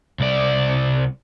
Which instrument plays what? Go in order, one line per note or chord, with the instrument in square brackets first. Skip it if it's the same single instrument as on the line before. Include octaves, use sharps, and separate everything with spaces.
[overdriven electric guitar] C2 D5